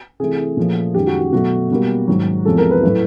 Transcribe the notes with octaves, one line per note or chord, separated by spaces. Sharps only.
C3 E3 A3 G#4
A#2 F3 A3
F#2 D#3 G#3 G4
F#4
F#4
B2 F#3 A3 F#4
B2 G3 A#3
G#2 D#3 F#3
E2 C3 F3 G#3 A4
A#4
B4
A2 F#3 A3